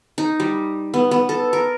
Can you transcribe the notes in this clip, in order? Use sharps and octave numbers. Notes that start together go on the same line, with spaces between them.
D#4
G3
B3
B3
A4
A#4